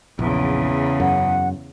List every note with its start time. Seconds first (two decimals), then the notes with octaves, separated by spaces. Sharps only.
0.19 A#1 E2 C#3
1.00 F#2 F#5